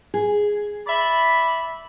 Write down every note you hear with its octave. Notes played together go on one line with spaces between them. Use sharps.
G#4
D5 E5 B5